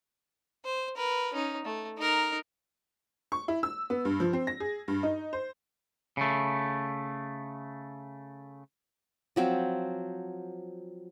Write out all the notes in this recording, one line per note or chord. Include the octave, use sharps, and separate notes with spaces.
C5
A#4 B4
C#4 D#4
A3
D#4 A#4
C#6
E4
E6
B3
G2
F3
C4
A#6
G#4
G2
D#4
C5
C#3 A3
F3 F#3 C4